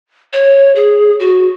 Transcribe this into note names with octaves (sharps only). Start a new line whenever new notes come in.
C#5
G#4
F#4